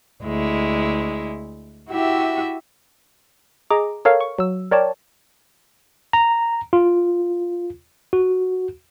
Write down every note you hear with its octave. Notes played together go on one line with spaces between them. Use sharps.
D2 G#3 E4
E4 F#4 G4 E5
G#4 D#5 A#5 D6
A4 A#4 C#5 F5
C#6
F#3 E6
A#4 C#5 D5 G5 A5
A#5
F4
F#4